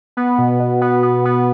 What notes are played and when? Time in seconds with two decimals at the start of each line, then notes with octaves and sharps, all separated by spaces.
0.17 B3
0.38 B2
0.60 B2
0.82 B3
1.03 B3
1.25 B3